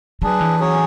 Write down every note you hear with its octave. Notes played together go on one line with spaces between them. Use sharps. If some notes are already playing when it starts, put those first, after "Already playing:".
F#3 D4 G#4 B4
E3
F#3 C#4 G#4 C#5